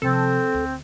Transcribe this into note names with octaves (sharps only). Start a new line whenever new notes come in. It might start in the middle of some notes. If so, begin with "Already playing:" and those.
C3 F3 C4 A4
D2